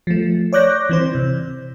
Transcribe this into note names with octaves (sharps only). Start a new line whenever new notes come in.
F3 A3
C#5 D5 D6 F#6 G6 A#6
E3 C4 C5
C3